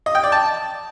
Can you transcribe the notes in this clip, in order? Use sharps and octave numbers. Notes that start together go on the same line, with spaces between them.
D#5
G5
D5
A5